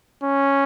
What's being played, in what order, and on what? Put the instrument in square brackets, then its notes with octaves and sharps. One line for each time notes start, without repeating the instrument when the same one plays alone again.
[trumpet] C#4